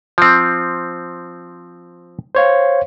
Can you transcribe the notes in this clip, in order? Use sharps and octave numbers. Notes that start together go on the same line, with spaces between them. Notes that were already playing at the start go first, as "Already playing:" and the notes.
F3 C4
C5 C#5 F5